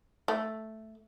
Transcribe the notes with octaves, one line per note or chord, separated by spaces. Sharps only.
A3